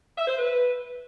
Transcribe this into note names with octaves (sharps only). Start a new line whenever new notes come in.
E5
C5
B4